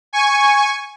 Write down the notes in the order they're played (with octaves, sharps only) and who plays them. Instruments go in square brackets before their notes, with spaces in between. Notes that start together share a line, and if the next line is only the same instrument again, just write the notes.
[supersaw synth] G#5 C#6